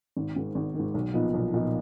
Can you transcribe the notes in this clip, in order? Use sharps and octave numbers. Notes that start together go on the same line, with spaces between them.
G#1
G#2 D#3
G#1
G#2 D#3
B1
A#2 F3 B3 D#4
B1
A#2 F3 B3 D#4